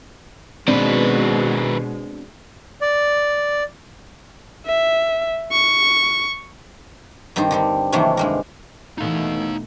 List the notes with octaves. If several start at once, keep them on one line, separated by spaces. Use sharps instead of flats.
B2 D#3 G#3 C4 D4 B4
D5
E5
C#6
G2 D#3 G3 C4 D#4
D3 G3 C4
C3 D#3 E3 F#3 A3 A#3
G2 G#3 A#4
B2 E3 A3 D#4 F5